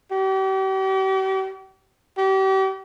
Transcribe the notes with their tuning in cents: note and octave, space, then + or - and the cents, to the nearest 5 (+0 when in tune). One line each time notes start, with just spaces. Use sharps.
G4 -40
G4 -35